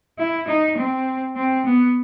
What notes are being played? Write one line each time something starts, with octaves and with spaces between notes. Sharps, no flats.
E4
D#4
C4
C4
B3